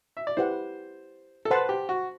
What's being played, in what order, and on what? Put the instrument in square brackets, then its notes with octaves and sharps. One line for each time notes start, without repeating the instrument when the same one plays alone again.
[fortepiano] E5
D5
[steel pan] E4 G4 B4 F#5 [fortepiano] C5
[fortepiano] A4
[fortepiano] B4 [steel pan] C5 F#5 A5 C6
[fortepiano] G4
F#4